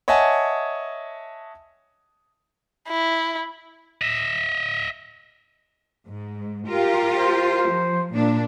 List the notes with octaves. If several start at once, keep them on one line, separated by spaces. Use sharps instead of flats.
C#5 D#5 E5 F#5 G#5 A5
E4
D#5 E5
G#2
F4 G4 A#4
C5
F3
A#2 D4